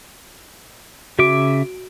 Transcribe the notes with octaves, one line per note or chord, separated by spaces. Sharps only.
C#3 F#4 E5 D6 D7